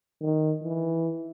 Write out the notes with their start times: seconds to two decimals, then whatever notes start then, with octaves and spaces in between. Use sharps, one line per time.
0.21 D#3
0.64 E3